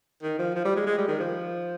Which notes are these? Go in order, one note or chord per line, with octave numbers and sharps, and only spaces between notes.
D#3
F3
F3
G3
G#3
G#3
G3
D#3
F3